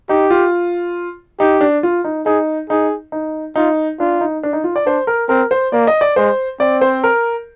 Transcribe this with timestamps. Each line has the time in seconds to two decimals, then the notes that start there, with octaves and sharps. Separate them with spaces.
0.09 D#4 G4
0.30 F4
1.39 D#4 G4
1.61 D4
1.83 F4
2.04 D#4
2.26 D#4 G#4
2.70 D#4 G#4
3.12 D#4
3.56 D#4 F4
4.00 D4 F4
4.21 D#4
4.43 D4
4.53 D#4
4.64 F4
4.76 D5
4.86 D4 C5
5.07 A#4
5.29 C4 A#4
5.51 C5
5.72 A#3 D5
5.87 D#5
6.01 D5
6.16 G#3 C5
6.60 C4 D5
6.81 C5
7.04 A#4